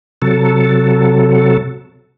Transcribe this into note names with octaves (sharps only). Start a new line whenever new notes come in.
C3 F#3 A4